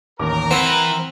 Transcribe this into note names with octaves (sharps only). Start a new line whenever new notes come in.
A1 D#2 A#4 A#5 D6
E3 C4 B4 F#5 B5